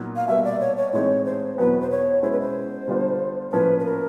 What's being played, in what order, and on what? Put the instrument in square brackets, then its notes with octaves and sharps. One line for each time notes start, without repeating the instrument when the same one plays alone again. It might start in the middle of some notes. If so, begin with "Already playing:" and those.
Already playing: [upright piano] A#2 F#3 B3 D#4
[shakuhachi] F5
[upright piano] B2 G3 A#3 [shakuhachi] E5
[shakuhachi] D5
C#5
C#5
[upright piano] A2 E3 G#3 C4 D#4 [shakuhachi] C#5
[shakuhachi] C5
[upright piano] E2 B2 F#3 B3 [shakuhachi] B4
[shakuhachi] C5
C#5
[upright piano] B2 G#3 C#4 E4 [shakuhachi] C5
[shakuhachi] B4
C5
[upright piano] D3 G3 B3 D4 F4
[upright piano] A2 F3 A#3 C#4 [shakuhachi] B4
[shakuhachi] B4
A#4